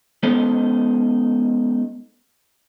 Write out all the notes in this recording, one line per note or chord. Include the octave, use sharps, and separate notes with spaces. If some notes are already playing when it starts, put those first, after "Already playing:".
G#3 B3 C#4 D#4 A4 C5